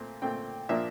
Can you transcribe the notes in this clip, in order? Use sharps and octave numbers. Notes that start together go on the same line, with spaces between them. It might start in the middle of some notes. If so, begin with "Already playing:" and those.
Already playing: A#2 A3 C4
A#2 A3 C4 G5
A#2 F3 A#3 D4 E5